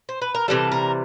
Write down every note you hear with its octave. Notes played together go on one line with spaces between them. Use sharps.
C5
B4
A#4
C3 E3 G3 A4
A#4